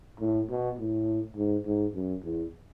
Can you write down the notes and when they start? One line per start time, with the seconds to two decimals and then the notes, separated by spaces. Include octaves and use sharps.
0.20 A2
0.50 B2
0.79 A2
1.36 G#2
1.66 G#2
1.95 F#2
2.23 E2